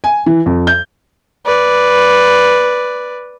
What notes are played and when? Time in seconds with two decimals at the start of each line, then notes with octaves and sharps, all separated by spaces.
0.04 G#5
0.26 E3
0.46 F2
0.67 G6
1.46 B4 D5